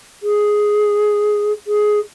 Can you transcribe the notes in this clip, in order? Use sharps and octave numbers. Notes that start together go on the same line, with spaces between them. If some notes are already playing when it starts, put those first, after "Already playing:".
G#4
G#4